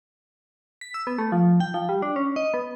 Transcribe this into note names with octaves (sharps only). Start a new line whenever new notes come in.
B6
E6
B3
A3
F3
G5
F3
G3
D4
C#4
D#5
B3